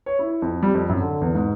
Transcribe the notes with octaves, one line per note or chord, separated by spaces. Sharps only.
C#5
E4
F2
G3
F2
F#2
D3
E2
G#2